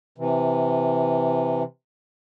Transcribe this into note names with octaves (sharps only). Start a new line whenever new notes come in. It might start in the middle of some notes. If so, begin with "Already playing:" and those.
C3 E3